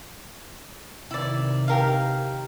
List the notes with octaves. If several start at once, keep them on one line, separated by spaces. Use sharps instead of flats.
C3 D#3 E4 D5
G4 A#4 F5